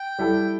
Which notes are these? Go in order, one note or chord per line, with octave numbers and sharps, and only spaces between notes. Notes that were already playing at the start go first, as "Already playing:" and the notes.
Already playing: G5
G3 E4 A4